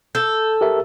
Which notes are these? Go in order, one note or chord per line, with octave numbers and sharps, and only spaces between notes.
A4 G6
G4 A#4 E5